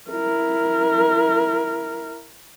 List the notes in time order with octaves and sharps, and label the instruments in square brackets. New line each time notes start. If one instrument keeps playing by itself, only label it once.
[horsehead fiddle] E4 A#4